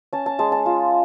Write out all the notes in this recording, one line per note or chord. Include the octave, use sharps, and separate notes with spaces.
C#4 A5
A5
G#3 A5
A5
F4